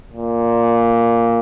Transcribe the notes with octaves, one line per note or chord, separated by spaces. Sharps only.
A#2